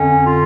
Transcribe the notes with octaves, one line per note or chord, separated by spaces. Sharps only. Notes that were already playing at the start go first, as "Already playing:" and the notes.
Already playing: F2 D3 C#4
F4